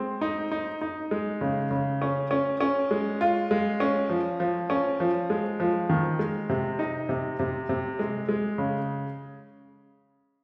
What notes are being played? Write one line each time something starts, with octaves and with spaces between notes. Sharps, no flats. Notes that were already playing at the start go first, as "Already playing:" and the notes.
Already playing: G#3 C4
D#4
D#4
D#4
G#3
C#3
C#3
C#4
C#4
C#4
G#3
F4
G#3
C#4
F3
F3
C#4
F3
G#3
F3
D#3
G#3
C3
D#4
C3
C3
C3
G#3
G#3
C#3